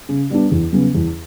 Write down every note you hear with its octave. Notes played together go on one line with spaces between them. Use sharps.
C#3
G3 B3 D4
E2
C#3 F#3 B3
E2